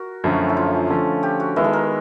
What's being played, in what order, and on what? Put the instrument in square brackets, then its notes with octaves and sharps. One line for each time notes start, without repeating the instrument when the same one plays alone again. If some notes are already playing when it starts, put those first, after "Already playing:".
Already playing: [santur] F#4 A#4
[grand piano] F#2 D3 F3 A3 C#4
[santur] E4
F4
[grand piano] D3 F3 A3 C#4
[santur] G4
F#4
[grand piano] D#3 G#3 B3 [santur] E4
[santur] A4
A#4